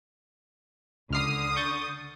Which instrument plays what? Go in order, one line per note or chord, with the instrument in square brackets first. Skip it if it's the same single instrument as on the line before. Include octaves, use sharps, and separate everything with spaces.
[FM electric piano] C#2 F6 C7 [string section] D3 D#6
[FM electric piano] C#6 G6 A6